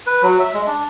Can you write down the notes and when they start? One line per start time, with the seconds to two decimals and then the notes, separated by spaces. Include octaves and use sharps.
0.07 B4
0.22 F#3
0.39 E5
0.54 G#3
0.67 D4